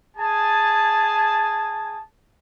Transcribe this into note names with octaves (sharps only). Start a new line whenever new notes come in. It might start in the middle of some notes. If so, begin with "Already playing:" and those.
G#4 G#5 A5